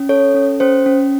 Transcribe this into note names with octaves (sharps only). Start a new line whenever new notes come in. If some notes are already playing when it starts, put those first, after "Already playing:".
Already playing: C#4
A4 C#5
C#4
C#4 C5
C#4